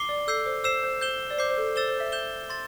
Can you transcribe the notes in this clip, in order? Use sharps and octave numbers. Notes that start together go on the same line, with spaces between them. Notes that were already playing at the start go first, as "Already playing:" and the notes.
Already playing: D6 C7 G7
D5
A4 E6 G6 C7
C5
C5 E6 C7 E7
C5
C5 G6 E7 G7
D5
C5 D6 G6 C7
C5
A4
C5 E6 A6 E7 G7
C5
E5
G6 E7 G7
C6 A6